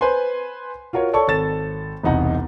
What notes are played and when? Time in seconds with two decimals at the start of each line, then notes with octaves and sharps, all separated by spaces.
0.01 B4 C5 G#5 C6
0.93 F4 F#4 A#4 C#5
1.13 A4 C#5 D5 A5 C#6
1.28 G#1 A4 A6 E7
2.03 E1 C2 D#4 F#5 A#5